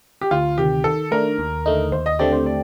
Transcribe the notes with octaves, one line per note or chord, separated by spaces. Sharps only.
G4
D2 F4
C3 D#3 G4
D#3 A4
A3 D4 A#4
D#2
D3 A3 D#4
D#2 C5
D#5
D3 A3 C4 G4 D5
C5
D5